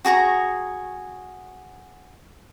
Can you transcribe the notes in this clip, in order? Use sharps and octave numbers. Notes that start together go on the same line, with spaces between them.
F#4 G#4 A#5 C#6